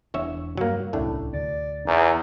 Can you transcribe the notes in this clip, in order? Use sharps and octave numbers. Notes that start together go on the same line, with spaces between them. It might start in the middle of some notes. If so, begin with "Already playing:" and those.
E1 E2 D4 C#5 E5
G2 F#3 A#3
D1 C2 A2 A3 C#4 D4
D2 D5
E2 D#4